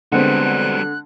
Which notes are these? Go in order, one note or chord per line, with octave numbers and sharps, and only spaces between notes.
D3 G3 G#3 B3 C4 F#4 F#6